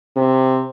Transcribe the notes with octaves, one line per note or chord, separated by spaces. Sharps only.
C3